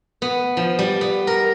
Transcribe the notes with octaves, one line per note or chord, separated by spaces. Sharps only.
B3
F3
G3
B3
A#4